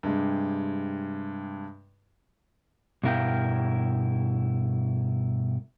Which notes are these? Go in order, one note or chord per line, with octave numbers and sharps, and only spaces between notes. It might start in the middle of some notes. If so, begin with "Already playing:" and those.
G2 C3 G#3
G2 B2 E4 A#4 F5 G5